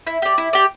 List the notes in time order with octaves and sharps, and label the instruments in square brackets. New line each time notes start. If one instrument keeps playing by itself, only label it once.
[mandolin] E4
G4 D5
E4
G4 D5